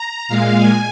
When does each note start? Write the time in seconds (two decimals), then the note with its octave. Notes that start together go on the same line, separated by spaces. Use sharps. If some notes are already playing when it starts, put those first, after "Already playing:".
Already playing: A#5
0.28 A#2 G#3 F5
0.58 G#5